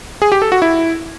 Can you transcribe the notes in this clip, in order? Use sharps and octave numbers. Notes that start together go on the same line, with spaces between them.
G#4
G4
A4
F#4
E4